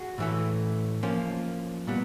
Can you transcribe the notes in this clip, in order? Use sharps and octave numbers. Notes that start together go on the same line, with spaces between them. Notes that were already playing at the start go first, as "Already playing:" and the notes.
Already playing: F#4 G#4
A2 E3 A3
F3 A#3 C#4
A#2 G3 B3